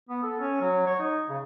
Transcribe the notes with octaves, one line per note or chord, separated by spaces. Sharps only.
B3
A4
C#4
F#3
C#5
D#4
C#3